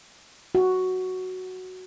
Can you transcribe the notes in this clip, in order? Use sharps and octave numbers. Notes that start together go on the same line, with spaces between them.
F#4